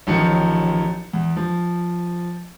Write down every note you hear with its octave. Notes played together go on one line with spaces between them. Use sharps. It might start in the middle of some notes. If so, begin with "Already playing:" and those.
A1 D#3 F3 F#3 C#7
E2
F3